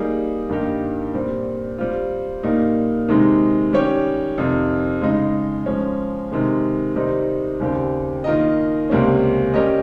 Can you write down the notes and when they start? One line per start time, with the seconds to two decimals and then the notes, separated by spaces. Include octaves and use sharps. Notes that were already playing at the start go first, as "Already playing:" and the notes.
Already playing: G3 A#3 D#4 G#4
0.49 G2 D#3 A#3 D#4 G4
1.14 A#2 G3 C4
1.78 G3 C4 F4
2.43 A#2 G3 A#3 D#4
3.09 C3 D#3 G#3 D#4
3.73 D#3 G3 C#4 G4 C#5
4.38 F2 C3 D#3
5.02 C#3 G#3 D#4
5.66 F3 G#3 C#4
6.32 C3 D#3 G#3
6.95 C3 D#3 G3 C4 D#4
7.60 D#2 C#3 G3 C4 G4
8.24 D#3 A#3 F4 A#4 D#5
8.89 C#2 C3 G3 A#3 C#4
9.54 G3 C#4 G4 A#4 D#5